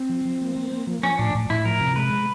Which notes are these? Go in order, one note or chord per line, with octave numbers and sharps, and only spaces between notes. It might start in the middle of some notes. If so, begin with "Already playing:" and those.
Already playing: C4
F3
F3
A#3
A#3
A#3
F3
F3 C#4
A2 D4
A2
A2 E4
F3 A#4
C3
G#3 B4